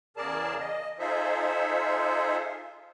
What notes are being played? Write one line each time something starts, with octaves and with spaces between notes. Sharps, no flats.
E2 C#3 G#4 A#4 D5 A5
D#5
D#4 F4 G#4 A4 C5 E5